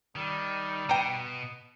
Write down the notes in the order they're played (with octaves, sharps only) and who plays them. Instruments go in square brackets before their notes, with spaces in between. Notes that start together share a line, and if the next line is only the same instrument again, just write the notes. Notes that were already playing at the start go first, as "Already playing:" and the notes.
[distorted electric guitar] D#3 [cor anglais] G3
[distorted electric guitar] B2 [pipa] G5 A#5